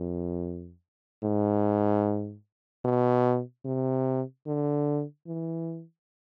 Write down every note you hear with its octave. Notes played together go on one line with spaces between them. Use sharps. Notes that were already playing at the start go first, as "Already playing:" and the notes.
Already playing: F2
G#2
B2
C3
D3
E3